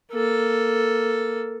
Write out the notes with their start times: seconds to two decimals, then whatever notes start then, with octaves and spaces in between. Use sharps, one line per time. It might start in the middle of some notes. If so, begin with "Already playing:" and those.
0.12 A#3 A4